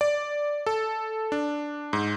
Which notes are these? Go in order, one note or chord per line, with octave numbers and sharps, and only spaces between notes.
D5
A4
D4
G#2